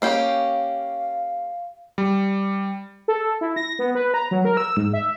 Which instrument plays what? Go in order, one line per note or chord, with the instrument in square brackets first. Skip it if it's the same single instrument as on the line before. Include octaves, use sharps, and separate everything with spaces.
[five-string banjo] A#3 C#4 G4 [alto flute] F5
[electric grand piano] G3
[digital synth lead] A4
E4
A#6
B3
B4
A#5
F#3
A#4
E6
G#2
E5